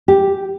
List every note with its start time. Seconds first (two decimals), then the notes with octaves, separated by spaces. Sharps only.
0.08 G4